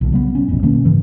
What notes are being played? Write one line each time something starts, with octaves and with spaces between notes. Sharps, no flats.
B1 A#2 D3
C#3 G3 B3
C#4
F1 A#1 E2 B2
B2 D#3 A#3 C#4
G#2 C#3 E3